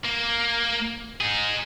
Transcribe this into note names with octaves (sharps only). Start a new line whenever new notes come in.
A#3
D#4 G#4